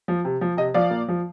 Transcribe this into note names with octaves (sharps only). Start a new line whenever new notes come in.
F3
C3
F3
C3 D#5
F3 D5 F5
A#2
F3